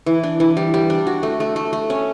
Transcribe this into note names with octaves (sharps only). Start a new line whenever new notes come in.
E3
D4
E3
G3
G3
D4
F#4
A3
A3
A3
A3
C#4